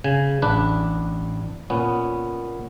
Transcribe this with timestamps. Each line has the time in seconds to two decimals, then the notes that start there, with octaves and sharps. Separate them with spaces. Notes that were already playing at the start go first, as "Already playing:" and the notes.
0.04 C#3 G#5
0.42 A1 D4 B4
1.70 A#2 B3 C#4